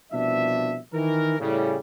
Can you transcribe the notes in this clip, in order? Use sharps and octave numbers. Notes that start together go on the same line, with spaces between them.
C2 B2 F3 D4 E5
D#3 E3 A#4
A2 C#3 G3